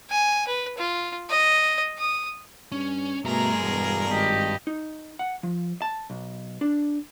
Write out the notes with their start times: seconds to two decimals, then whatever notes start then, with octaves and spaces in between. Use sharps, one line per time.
0.11 G#5
0.47 B4
0.78 F4
1.30 D#5
1.98 D#6
2.72 G2 C#4
3.25 G2 B2 A3 G#4 A#4 A#5
3.61 E1 B2
4.09 G#1 G4 D#5
4.67 D#4
5.19 F#5
5.43 F3
5.82 A5
6.10 B1
6.61 D4